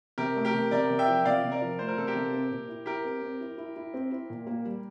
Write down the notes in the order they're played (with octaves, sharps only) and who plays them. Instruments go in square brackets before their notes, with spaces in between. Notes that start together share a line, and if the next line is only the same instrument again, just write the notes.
[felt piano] C3 [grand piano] G4 A#4
[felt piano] A3
[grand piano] G4 A#4
[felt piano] C3
[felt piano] C3 [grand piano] A#4 D5
[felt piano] C3
[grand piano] E5 G5
[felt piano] F3
[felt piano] C3 [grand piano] D5 F5
[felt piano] C3
[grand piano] A#4 D5
[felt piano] F3
[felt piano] A3 [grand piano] C5
[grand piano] A#4
[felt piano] C3 [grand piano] A4
[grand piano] G4 A#4
[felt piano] C3
C4
A#2
E4
[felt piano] E4 [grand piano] G4 A#4
[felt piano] C4
C4
E4
E4
E4
C4
E4
A#2
A#3
G3